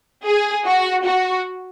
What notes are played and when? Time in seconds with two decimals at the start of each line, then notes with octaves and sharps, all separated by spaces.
0.25 G#4
0.66 F#4
1.05 F#4